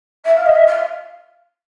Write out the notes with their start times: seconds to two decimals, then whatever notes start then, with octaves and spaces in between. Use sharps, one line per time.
0.25 E5
0.36 F5
0.46 D#5
0.55 E5
0.66 F5